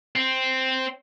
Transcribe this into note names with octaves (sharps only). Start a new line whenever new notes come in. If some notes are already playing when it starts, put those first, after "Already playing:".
C4